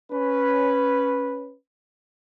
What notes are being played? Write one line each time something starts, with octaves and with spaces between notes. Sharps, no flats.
C#4 B4